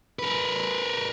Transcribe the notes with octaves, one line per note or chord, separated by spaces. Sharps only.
A#4 B4